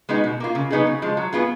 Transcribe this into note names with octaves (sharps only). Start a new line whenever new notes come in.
G#3 B3 D#4 F#4
B2
A#3 F4
C#3
F#3 B3 D#4 G#4
C#3
F3 G#3
F#3
B3 F4 G#4